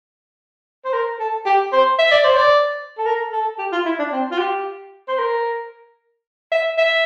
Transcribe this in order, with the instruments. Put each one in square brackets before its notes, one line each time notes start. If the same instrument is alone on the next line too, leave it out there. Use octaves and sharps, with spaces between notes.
[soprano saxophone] C5
A#4
A4
G4
C5
E5
D5
C5
D5
A4
A#4
A4
G4
F4
E4
D4
C4
F4
G4
C5
A#4
E5
E5